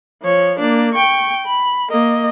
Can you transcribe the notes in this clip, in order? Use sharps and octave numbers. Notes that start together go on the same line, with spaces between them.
F3 C#5
A#3 D4
G5 C#6
B5
A#3 D#5